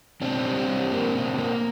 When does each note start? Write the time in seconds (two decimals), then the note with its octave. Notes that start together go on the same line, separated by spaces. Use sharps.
0.21 B2 C4 D4
0.45 G3
0.68 G3
0.92 A#3
1.14 B2
1.38 A#3